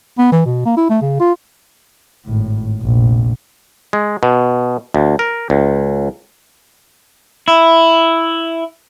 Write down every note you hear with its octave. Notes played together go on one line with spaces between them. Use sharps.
B3
E3
B2
A#3
E4
A3
C#3
F4
G#1 A2
F1 A#1
G#3
B2
D2
A#4
C#2
E4